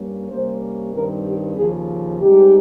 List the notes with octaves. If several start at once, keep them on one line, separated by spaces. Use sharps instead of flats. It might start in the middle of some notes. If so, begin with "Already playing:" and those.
Already playing: G2 G3 A#3 C#4
C3 G3 A#3 C#4 C5
G2 D#3 G3 C4 D#4 A#4
G4
D#2 C#3 F3 G#4
G#2 G3 C4 D#4 G4